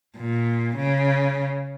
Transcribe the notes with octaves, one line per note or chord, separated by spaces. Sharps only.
A#2
C#3